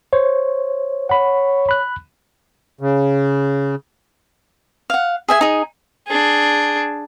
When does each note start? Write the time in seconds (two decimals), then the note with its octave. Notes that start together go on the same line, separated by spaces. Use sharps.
0.13 C5 C#5
1.09 C#5 F#5 B5
1.69 B5 F#6
2.81 C#3
4.90 F5 F#5
5.28 G#4 E5 G#5
5.41 D#4 G#4
6.08 D4 G#4